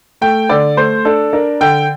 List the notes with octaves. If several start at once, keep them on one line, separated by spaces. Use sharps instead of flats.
A3 G5
D3 D5
A3 C5
D4 A4
D4 A#4
D3 G5